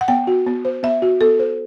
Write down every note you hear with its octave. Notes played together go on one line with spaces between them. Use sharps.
F#5
B3 G5
F#4
B3
C5
B3 E5
F#4
B3 A4
C5